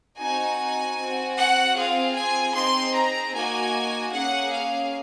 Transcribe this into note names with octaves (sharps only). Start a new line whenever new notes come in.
C4 D#4 F#4 G#5
C4 F#4
F#5
C4 F4 G#4 F5
G#5
C4 D#4 G#4 C6
A#5
A#3 D#4 F#4 G#5
A#3 C#4 G#4 F#5
F5